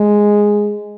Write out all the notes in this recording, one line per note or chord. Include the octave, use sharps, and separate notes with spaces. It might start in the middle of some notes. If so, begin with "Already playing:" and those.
Already playing: G#3